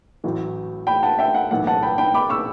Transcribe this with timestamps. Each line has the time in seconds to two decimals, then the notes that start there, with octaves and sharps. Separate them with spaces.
0.24 A1 A2 F#3
0.87 G5 B5
1.03 F#5 A5
1.19 E5 G5
1.34 F#5
1.51 B1 A2 E3 A3 F#5
1.67 F#5 A5
1.83 G5 B5
1.98 G5 B5
2.14 B5 D6
2.30 C#6 E6